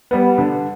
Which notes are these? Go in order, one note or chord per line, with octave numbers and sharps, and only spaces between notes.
G3 B3
D3